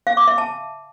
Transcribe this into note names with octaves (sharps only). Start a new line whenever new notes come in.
F5
D6
E5
A5